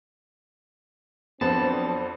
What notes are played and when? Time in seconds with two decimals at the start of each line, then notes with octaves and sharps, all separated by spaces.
1.41 F2 F#3 B3 C4 D4 C5 A5 B5